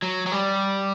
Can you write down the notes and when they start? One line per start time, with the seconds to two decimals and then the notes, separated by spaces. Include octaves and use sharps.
0.02 F#3
0.26 F#3
0.32 G3